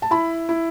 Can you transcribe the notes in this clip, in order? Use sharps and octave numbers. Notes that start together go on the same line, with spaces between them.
A5
E4 B5
E4